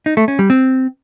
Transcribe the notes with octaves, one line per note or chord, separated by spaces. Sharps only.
D#4
A3
C#4
G3
C4